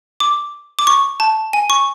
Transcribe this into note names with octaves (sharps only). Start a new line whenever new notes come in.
D6
D6
C#6
A5
G#5
C#6